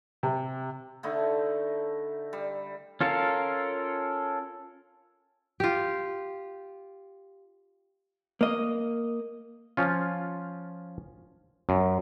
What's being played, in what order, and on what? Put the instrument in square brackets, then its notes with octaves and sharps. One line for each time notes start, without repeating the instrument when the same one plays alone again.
[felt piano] C3
[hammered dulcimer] D3 A3 D#4 E4
G3
[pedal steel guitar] C#4 F4 A4 A#4 F5
[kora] F4 G4
[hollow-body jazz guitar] A#3 D#5
[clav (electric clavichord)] F3 C#4 F4
F#2